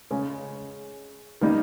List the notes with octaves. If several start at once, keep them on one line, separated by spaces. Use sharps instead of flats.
C#3 G#3 C#4
D#3 G3 A#3 D#4